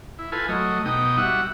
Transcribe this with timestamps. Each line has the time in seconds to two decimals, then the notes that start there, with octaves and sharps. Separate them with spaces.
0.19 E4
0.32 F4 A4 B4 G#5
0.49 F#3 A3 D#5
0.85 B2 D#4 G5 D#6
1.17 G3 F#4 E5 F#5